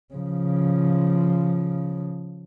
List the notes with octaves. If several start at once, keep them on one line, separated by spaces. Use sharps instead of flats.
C#3 F3